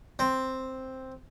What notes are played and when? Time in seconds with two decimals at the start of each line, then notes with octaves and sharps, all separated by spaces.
0.19 C4